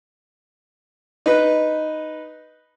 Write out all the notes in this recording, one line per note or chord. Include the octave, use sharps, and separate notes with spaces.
D#4 B4